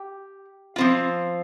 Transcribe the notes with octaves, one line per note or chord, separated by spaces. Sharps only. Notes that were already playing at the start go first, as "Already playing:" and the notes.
Already playing: G4
F3 C4 F4